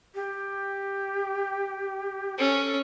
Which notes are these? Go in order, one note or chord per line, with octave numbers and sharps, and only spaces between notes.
G4
C#4 A4